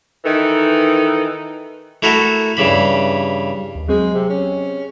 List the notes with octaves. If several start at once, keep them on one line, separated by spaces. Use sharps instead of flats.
D#3 E3 D#4 A4
A3 E4 F#4 A4 A#4
G2 C#3 E3 B5
D#2
F#3 G#3 C4 G#4
C3
C#4